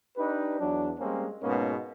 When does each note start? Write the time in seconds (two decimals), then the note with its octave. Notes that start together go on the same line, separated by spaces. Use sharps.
0.17 D4 D#4 G4 B4
0.60 E2 F#3 D4
1.00 G3 G#3 A#3 C4 C#4
1.43 G#2 B2 G#3 A#3 B3 C#4